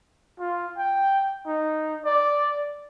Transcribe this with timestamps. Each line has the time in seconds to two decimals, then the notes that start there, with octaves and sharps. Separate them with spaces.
0.39 F4
0.78 G5
1.47 D#4
2.05 D5